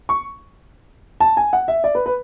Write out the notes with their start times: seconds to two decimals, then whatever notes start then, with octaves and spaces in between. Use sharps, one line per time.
0.09 C#6
1.20 A5
1.37 G#5
1.53 F#5
1.68 E5
1.84 D5
1.95 B4
2.06 B4